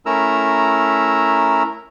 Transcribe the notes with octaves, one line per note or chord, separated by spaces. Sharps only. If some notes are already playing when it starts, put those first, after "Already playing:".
A3 C#4 E4 A#4 A#5 E6